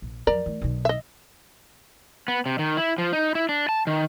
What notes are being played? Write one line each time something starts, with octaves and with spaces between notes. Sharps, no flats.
A#1
F2 F#3 A#4 D5 A#5
E3 A3
B1 D#3
D#5 E5
B3
C3
D#3
E4
F3
D#4
E4
D4
A5
D#3